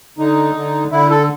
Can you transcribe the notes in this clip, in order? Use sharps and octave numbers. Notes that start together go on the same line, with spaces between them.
D3 D#4
D3
D3 E4
A4